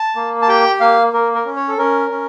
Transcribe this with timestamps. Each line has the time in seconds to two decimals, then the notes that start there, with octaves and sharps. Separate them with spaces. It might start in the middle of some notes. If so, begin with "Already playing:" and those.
Already playing: A5
0.16 A#3
0.42 A5
0.48 G4 G5
0.80 A#3 F5
1.13 A#3 A#4
1.35 A#4
1.45 C#4
1.56 C#5
1.68 A4
1.77 C#4 A#4
2.10 C#4